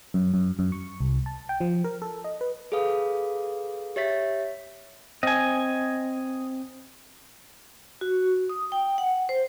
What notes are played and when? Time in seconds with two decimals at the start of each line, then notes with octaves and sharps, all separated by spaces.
0.14 F#2
0.34 F#2
0.59 F#2
0.72 C#6
1.00 C2
1.26 A5
1.49 G5
1.61 F3
1.84 A#4
2.02 A4
2.24 D#5
2.41 B4
2.72 G#4 A4 B4 F5 D#6
3.96 G4 C#5 E5 A6 B6
5.23 C4 D#5 G#5
8.01 F#4
8.49 D#6
8.72 G5
8.98 F#5
9.29 C5